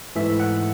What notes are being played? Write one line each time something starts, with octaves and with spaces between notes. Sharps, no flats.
G#2 E3 A3 E5
F#5